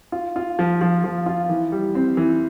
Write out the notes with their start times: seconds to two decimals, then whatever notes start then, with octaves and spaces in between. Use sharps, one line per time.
0.12 F4
0.36 F4
0.59 F3
0.81 F3
1.04 F3
1.26 F4
1.49 E3
1.72 G3
1.95 C4
2.17 E3